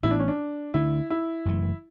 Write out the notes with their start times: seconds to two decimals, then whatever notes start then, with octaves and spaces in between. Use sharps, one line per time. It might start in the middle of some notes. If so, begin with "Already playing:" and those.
0.03 A1 A2 E3 B3 E4
0.11 D4
0.20 C#4
0.28 D4
0.74 D2 D3 A3 D4 E4
1.10 E4
1.45 F#1 F#2 E3 A3